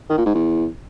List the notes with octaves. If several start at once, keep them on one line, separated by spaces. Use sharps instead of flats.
D#3
A#2
G#2
E2